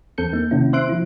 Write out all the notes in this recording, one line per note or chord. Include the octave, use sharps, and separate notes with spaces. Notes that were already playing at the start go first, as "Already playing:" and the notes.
E2 C4 A4 G6 C#7
A#3 D#4
C3 D#3 C#4 E4
C4 C5 E5 C6 F#6 D7
F3 E4